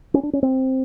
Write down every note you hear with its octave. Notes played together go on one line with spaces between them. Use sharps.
C#4
D4
C#4
C4